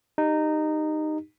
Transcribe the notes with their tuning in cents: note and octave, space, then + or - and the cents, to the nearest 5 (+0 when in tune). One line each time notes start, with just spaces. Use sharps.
D#4 -15 G4 +0